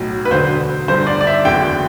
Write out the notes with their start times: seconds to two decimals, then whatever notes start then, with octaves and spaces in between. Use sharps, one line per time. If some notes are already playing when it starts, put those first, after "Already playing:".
Already playing: B1 A2 F#3
0.25 B4
0.31 E1 D2 D3 F#3 C5
0.88 G1 G2 D3 C5
1.07 D5
1.21 D5
1.27 E5
1.45 F#1 E2 D3 F#3 G5